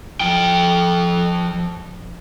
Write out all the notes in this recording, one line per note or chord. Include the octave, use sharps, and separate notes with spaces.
F3 G5